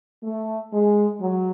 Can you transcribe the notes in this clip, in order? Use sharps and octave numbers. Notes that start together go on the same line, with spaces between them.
A3
G#3
F#3